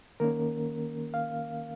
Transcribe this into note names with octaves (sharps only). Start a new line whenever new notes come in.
D#3 A#3 C#4 A#4
F5